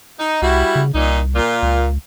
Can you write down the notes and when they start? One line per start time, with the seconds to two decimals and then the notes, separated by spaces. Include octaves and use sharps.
0.19 D#4
0.42 C2 G3 E4 F#4
0.75 C#3
0.94 C2 A#2 D#4
1.35 A#2 F4
1.62 C#2